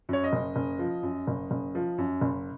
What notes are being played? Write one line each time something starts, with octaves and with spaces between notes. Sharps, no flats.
F#2 C#5
D#5
F#1
F#1
F3
F#2
F#1
F#1
F3
F#2
F#1